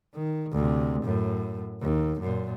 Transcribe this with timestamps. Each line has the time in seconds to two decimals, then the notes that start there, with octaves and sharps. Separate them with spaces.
0.14 D#3
0.52 D2 C3
1.04 F#2 A2
1.82 D#2
2.20 F#2 A#2